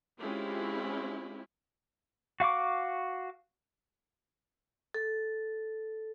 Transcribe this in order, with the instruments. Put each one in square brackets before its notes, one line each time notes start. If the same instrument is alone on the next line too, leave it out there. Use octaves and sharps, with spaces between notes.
[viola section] G#3 C4 C#4 E4 F4 G4
[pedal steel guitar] F#4 F5 C#6 D6
[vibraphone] A4